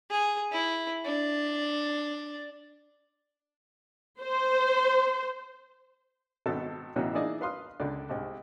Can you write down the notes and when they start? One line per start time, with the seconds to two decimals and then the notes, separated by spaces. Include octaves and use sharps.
0.10 G#4
0.52 E4
1.05 D4
4.21 C5
6.46 G#1 B2 B3 A4 D#5 A5
6.96 A1 B2 E3 C#4 F#4 A#4
7.14 E3 A#3 D#4 G#4 D5 D#5
7.41 B4 F5 C6 D#6
7.80 C#2 D3 D5
8.10 C2 G#2